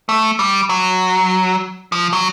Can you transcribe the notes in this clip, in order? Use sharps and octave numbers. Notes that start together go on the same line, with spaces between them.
A3
G3
F#3
F3
F#3